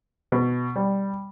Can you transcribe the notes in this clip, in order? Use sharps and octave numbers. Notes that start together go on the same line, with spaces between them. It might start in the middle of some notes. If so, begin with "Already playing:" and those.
B2
G3